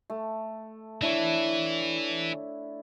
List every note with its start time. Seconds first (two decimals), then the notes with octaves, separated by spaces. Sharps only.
0.10 A3
1.02 E3 D4 E4 C#5